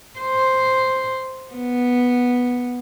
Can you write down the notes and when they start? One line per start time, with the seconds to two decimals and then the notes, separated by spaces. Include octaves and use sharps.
0.20 C5
1.54 B3